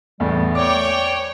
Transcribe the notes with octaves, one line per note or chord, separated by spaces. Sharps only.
E2 A2 G3
C#5 D5 G5 D6